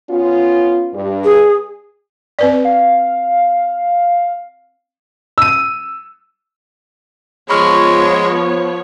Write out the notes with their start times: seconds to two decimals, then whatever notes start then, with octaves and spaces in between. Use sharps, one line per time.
0.10 B3 C#4 F4
0.94 G2
1.24 G#4
2.39 C4 B4 D5
2.65 F5
5.38 E6 D#7
7.50 F3 G#3 B3 C#5 B5 C#6 F6